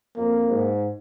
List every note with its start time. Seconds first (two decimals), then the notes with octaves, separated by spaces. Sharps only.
0.17 F2 A#3
0.50 G#2